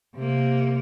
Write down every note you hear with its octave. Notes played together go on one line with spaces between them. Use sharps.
C3 A#3